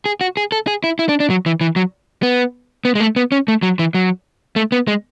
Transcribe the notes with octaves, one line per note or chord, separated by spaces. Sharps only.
G#4
F#4
G#4
A4
G#4
E4
E4
D4
D4
F#3
E3
E3
F#3
B3
B3
G#3
A3
B3
C#4
A3
F#3
E3
F#3
A3
B3
G#3